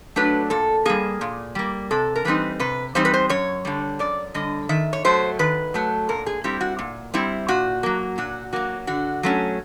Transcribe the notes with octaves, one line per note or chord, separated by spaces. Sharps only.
F#3 A3 D4 B4
A#2 A4
G3 A#3 G#4
A#2
G3 A#3
C3 A4
A#4
E3 G3 C4 D#4 B4
C3 B4
E3 G3 C4 D#4 C5
B4
C5
F#2 C#5
D3 G3
F#2 D5
D3 G3 D#5
D#3 E5
C#5
F#3 A3 C5
D#3 B4
F#3 A3
A#2 A#4
G#4
G3 C4 E4 G4
F#4
A#2
G3 C4 E4
A#2 F#4
F#3 A#3
A#2 F#4
F#3 A#3 F#4
D3 F#4
F#3 A3 C#4